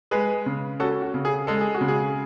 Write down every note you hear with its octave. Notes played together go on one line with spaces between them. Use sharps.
G#3 G#4 B4
C#3
C#4 F#4 A4
F#4
C#3
G#4
G#3 A4
G#4
F#4
C#3
G#4